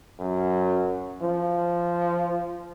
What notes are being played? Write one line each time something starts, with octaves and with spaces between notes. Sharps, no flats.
F#2
F3